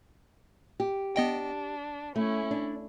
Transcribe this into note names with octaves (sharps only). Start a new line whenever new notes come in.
G4
B3 D4 D#5 G5
A3 C#4 E4
D4